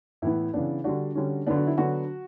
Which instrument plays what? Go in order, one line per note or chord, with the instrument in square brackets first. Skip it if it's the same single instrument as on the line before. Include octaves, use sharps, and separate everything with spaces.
[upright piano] A2 E3 B3 E4
C#3 E3 B3 D4
D3 G3 D4 F#4
D3 G3 C#4
D3 F#3 B3 D4
F#4
E4
D3 F#3 B3 D4 F#4